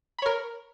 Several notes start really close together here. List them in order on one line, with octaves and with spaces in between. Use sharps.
B5 C#5 A#4